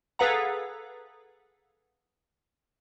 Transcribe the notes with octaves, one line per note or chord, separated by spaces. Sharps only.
G#4 A4 B4 F5 F#5 A#5